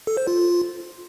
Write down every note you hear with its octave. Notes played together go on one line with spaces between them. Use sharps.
A4
C5
F4